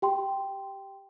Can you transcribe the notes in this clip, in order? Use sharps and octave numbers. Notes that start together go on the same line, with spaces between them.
G4 G5 C6